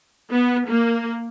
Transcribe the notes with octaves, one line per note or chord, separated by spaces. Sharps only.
B3
A#3